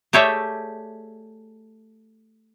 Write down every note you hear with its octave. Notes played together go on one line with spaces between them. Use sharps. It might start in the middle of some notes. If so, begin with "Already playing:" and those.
A3 G4 G#4 C#5 D5 E5